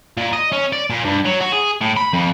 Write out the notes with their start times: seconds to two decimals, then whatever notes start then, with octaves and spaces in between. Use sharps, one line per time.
0.17 A#2
0.33 D#5
0.52 C#4
0.73 D5
0.90 A#2
1.05 G2
1.25 F#3
1.41 F#4
1.53 G#4
1.81 A2
1.97 B5
2.13 F2